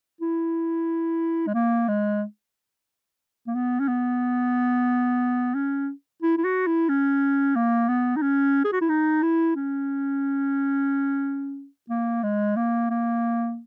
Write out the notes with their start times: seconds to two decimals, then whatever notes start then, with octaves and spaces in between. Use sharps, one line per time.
0.21 E4
1.47 G#3
1.54 A#3
1.88 G#3
3.47 A#3
3.55 B3
3.80 C#4
3.88 B3
5.55 C#4
6.22 E4
6.38 E4
6.44 F#4
6.66 E4
6.89 C#4
7.55 A#3
7.88 B3
8.16 D#4
8.22 C#4
8.65 G#4
8.72 F#4
8.81 E4
8.89 D#4
9.22 E4
9.56 C#4
11.90 A#3
12.23 G#3
12.56 A#3
12.90 A#3